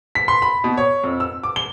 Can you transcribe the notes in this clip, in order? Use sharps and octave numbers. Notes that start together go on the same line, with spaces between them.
B6
C6
B5
B2
C#5
F2
E6
D6
G7